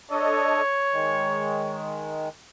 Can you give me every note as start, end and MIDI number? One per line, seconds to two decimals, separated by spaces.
0.11 0.61 62
0.11 0.61 69
0.11 1.82 73
0.11 0.61 75
0.93 2.29 51
0.93 2.29 56